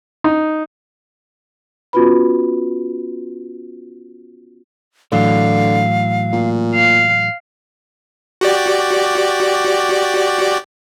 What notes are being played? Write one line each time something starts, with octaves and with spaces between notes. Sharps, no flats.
D#4
B3 C#4 F4 F#4 B4 B5
A2 D3 E3 F#3 F5
A#2
F5
F#4 G4 D5